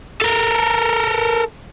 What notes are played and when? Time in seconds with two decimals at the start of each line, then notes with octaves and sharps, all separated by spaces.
0.22 A4 A#4